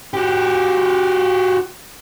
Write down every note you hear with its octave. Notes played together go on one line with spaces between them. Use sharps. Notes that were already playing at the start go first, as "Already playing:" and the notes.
F#4 G4